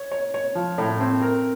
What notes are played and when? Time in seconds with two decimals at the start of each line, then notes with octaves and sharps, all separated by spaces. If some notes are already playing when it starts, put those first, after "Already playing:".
Already playing: C#5
0.12 C#5
0.34 C#5
0.55 F3
0.78 A2
1.00 C4
1.22 A#4